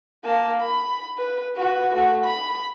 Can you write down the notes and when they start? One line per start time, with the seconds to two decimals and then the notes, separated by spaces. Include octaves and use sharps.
0.24 A#3 A5
0.61 B5
1.18 B4
1.56 F#4 B4
1.94 A3 F#4
2.25 B5